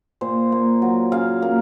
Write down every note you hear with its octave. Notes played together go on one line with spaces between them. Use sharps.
A#2 C5
A#3
F#3
C#3 F5
A#3